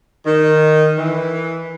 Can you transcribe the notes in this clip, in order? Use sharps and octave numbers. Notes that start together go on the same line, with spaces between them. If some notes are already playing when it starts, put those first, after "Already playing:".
D#3
E3